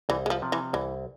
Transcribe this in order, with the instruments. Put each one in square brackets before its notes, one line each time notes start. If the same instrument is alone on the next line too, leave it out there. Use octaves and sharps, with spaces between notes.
[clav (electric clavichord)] C2 [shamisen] E3
[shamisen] G#3
F3
[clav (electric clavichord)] C3 F3
[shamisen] E3
[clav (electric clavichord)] C2 [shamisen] E3